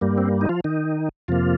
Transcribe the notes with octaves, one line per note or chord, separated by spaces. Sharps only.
G2 G3 A#3
C4
D#4
F3 F4
D#3 D#4
F2 C3 F3 A#3 F4